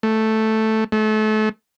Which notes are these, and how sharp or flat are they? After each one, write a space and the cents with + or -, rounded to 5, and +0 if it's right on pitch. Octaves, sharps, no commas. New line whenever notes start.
A3 +0
A3 -30